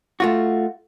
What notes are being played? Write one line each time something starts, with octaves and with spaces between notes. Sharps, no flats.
A3 F4 F#4